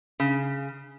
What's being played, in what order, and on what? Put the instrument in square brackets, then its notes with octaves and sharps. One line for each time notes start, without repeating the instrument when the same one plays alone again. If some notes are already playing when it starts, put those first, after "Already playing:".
[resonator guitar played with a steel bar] C#3